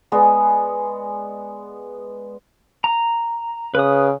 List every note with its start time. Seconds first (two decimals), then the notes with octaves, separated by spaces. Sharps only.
0.12 G#3 B3 D5 D#5
2.84 A#5
3.75 C#3 B4 D#6